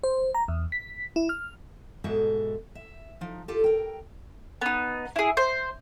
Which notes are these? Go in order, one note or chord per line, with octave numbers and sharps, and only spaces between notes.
C5
A#5
E2
B6
E4
F6
G#2 B2 G#3 F#4 A4 E5
E5
F3 D#4
F4 G4 A4
A#4 G5
B3 D#4
E4 G#4
C5